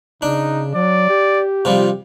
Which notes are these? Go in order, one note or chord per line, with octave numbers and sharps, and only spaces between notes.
C#3 D4 D#4
F#3 D5
G4
C3 F3 G3 F4